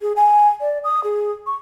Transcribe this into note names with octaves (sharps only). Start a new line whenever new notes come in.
G#4
G#5
D5
D#6
G#4
C#6